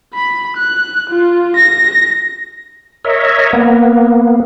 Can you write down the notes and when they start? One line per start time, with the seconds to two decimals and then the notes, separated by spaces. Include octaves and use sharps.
0.14 B5
0.57 F#6
1.10 F4
1.56 A#6
3.04 A#4 C#5 D#5 E5
3.53 A#3 B3